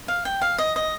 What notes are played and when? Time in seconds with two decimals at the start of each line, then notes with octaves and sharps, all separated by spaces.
0.08 F5
0.25 G5
0.42 F5
0.58 D#5
0.76 D#5